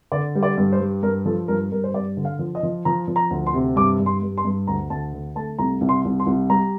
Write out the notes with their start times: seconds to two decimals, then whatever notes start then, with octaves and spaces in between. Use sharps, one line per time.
0.12 D3 D5
0.35 G3
0.43 D5
0.58 G2
0.73 C5
0.80 G3
1.03 G2 A#4
1.25 F3 A4
1.48 G2 A#4
1.72 G2 A#4
1.84 C5
1.94 G2 D5
2.17 D3
2.25 F5
2.39 F3
2.55 D#5
2.63 F3
2.85 F3 A#5
3.08 F3
3.16 A#5
3.31 D2
3.47 C6
3.54 C3
3.76 G2 D6
3.99 G2
4.06 C6
4.22 G2
4.37 C6
4.45 G2
4.67 D2 A#5
4.90 D2 A5
5.13 D3
5.35 A3 A5
5.59 C2 A#5
5.81 C2
5.89 C6
6.05 C2
6.20 C6
6.26 C2
6.50 G3 A#5